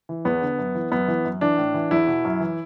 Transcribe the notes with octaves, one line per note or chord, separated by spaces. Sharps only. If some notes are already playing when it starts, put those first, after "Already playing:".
E3
E2 B3
D3
F#2
E3
F#2 B3
E3
F#2
E3 D4
A2
E3
E2 E4
B2
F#2
E3